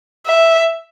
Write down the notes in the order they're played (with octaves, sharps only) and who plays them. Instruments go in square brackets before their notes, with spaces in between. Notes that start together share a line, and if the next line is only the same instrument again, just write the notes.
[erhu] E5